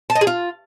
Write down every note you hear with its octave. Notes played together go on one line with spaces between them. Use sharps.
A5
D#5
G#4
F4